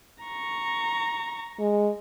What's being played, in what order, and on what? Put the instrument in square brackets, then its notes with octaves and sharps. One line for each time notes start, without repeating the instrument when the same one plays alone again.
[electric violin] A#5 C#6
[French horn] G#3